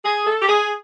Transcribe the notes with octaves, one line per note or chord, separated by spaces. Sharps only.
G#4
A4
G4
G#4